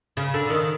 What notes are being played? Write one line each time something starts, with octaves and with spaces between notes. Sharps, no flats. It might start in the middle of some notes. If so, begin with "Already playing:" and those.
C#3
D3
D#3